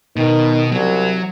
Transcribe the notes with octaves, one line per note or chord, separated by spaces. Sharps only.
B2 D#3
C2 F#3